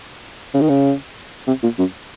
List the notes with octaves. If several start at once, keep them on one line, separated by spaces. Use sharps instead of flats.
C#3
D#3
C#3
C3
A#2
F#2